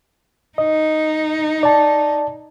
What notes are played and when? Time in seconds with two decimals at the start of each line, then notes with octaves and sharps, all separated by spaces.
0.58 D#4 D#5
1.63 D5 A5